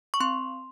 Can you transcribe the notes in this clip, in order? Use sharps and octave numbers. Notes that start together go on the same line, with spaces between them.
C#6
C4 C6